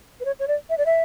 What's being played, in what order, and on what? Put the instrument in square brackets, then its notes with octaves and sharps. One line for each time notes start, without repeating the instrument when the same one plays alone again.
[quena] B4
C#5
C#5
D5
E5
D5
E5